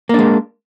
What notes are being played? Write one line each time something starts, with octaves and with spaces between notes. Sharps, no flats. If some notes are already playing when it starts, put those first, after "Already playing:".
G#3 A#3 D4